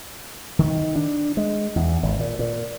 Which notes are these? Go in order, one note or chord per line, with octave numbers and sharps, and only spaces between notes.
D#3
D4
G#3
E2
G#1
A#2
A#2